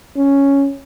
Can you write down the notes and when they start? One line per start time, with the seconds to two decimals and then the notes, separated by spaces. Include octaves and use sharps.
0.16 C#4